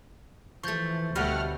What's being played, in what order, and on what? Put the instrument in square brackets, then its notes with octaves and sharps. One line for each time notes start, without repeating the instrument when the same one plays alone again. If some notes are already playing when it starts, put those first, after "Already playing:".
[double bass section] E3 [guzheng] F3 A3 [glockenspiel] C#6 G6 A6
[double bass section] D2 [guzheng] B2 G3 D#5 [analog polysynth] A3 F#5 F6